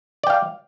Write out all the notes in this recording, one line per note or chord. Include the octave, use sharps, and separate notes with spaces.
D5 F5 G5